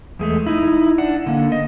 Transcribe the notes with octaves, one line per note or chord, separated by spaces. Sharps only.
E2 G#3 A3
D#4 E4
D4 F#5
D3 A#3
D#5